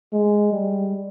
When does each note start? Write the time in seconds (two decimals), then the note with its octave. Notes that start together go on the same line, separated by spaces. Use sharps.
0.13 G#3
0.53 G3